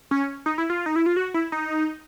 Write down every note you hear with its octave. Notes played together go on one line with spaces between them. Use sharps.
C#4
D#4
E4
F4
D#4
E4
F4
F#4
E4
D#4